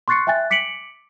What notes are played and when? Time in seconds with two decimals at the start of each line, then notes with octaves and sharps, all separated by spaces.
0.08 C6 C#6 F#6 A6 C7 C#7
0.27 E5 G5 G#5 F#6 A6
0.50 D6 B6 C#7 D7 F#7